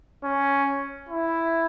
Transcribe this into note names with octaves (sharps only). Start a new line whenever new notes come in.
C#4
E4